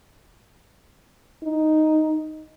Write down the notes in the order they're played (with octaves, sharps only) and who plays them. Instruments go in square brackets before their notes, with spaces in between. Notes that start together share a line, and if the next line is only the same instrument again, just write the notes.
[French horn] D#4